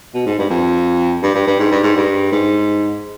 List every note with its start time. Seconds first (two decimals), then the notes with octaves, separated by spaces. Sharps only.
0.15 B2
0.26 G#2
0.39 G2
0.50 F2
1.23 G2
1.35 G2
1.47 G2
1.60 G#2
1.71 G2
1.83 G#2
1.96 G2
2.32 G#2